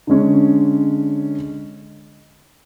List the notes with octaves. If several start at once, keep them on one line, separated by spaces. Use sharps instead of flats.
D3 G#3 C#4